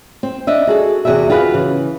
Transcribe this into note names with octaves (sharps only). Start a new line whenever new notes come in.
C4
D4 D#5 E5
F#4 G#4 A4
E2 C3 F#4 G#4 D5 E5
F4 F#4 G#4 B4 F5 F#5
C#3 E3